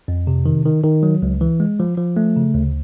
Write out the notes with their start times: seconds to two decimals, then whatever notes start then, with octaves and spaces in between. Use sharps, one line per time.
0.08 F2
0.27 C3
0.46 D#3
0.65 D#3
0.84 D#3
1.03 F#3
1.22 C#2
1.41 E3
1.60 G#3
1.80 F3
1.98 F3
2.17 A3
2.37 C#3
2.54 D2